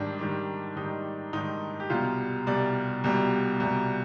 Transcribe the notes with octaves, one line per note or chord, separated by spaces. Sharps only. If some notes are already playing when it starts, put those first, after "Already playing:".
Already playing: G#2 D#3 G3 D4
G#2 D#3 G3
G#2 D#3 G3 D#4
G#2 D#3 G3 D#4
G4
C2 B2 G3 F4
C2 B2 G3 D5
C2 B2 G3
C2 B2 G3